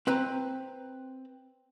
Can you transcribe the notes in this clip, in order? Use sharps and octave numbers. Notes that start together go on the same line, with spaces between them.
C4 B4 A#5